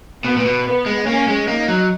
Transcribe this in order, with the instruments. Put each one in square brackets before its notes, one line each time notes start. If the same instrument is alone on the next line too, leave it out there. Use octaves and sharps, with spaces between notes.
[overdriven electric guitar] B2 [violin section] B3
[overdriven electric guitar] A#2
B2
[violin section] B3
[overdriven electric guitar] G#3
[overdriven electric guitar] A#3 [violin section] C#4
[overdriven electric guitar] G#3
[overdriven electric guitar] A#3 [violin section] D#4
[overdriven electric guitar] F#3